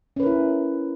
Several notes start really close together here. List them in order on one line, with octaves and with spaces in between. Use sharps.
C#4 B4 A#4 E4